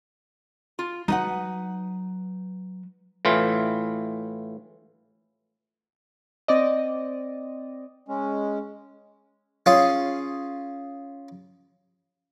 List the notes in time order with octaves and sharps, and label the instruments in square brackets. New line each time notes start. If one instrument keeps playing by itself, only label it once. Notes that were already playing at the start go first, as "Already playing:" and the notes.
[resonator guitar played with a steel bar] F4
[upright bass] F#3 [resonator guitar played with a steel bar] D#4 B4 F#5
[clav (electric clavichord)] A2 E3 F4
[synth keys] C4 D5 D#5
[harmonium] G#3 C#4
[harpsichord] C#4 F4 G#4